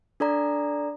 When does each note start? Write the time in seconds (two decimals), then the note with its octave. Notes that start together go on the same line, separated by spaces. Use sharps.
0.20 D4 A4 D5 A#5